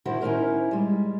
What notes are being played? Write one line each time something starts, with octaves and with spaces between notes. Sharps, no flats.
D#3 D4 E4 F#4 C5
C#4 D#4 E4 G4 A#4 C5
G3 G#3